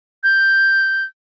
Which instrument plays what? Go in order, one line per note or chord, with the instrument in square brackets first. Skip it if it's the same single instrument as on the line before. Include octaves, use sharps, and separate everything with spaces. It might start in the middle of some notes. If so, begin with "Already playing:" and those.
[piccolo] G6